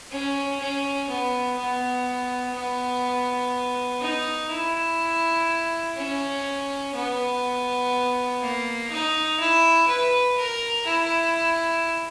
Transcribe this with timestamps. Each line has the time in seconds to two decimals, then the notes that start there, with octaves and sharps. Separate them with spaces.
0.11 C#4
0.60 C#4
1.09 B3
1.58 B3
2.55 B3
4.01 D#4
4.51 E4
5.97 C#4
6.95 B3
8.42 A#3
8.90 D#4
9.40 E4
9.88 B4
10.38 A#4
10.86 E4